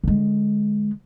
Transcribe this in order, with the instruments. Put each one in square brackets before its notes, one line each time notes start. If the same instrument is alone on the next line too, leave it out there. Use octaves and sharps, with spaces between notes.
[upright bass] D3 G#3